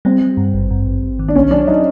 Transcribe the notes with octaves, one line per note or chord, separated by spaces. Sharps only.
G3 C4
G3
G2
G#1
G2
G#1
G#1
D#3
D4
B1 C#4
F#3 D4
F#3 D#4